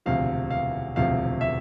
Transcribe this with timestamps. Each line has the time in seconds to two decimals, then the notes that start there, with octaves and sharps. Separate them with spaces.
0.06 E1 D2 C3 F3 F5
0.51 F5
0.96 E1 D2 C3 F3 F5
1.41 E5